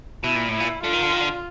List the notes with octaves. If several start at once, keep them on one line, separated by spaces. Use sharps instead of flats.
B2 E4
A#2
A2
E4
A#2
D3 F4
D#3
D3
D#3
D3